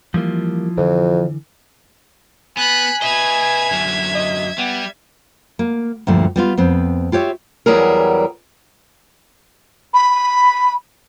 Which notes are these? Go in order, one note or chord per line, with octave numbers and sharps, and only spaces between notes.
E3 F3 G3 A#3 E4 F4
F2 D3 E3
B3 G#5 B5 F#6
B4 D#5 E5 G#6
F#2 D3
D#5
G3 B3
A#3
D2 G2 A#2 F3 A3
G3 B3 F4
F2 B3 C4
F4 G4 C#5 E5
E2 E3 F#3 G3 G#4 A#4
B5